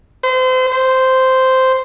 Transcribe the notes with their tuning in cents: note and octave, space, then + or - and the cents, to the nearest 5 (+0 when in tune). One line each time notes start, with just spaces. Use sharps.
C5 -30
C5 -5